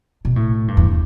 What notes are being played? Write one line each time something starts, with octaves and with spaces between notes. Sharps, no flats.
B2
A2
G2
E2